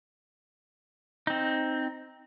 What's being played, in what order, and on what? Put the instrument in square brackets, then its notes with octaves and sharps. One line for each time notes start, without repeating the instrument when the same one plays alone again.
[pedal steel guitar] C4 D#4